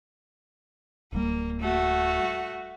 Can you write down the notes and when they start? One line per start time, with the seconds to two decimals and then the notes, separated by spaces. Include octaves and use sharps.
1.13 D1 G3 A#3
1.61 A3 F#4